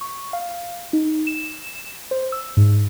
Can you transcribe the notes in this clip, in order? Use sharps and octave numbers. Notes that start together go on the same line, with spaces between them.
C#6
F5
D#4
E7
C5
E6
G#2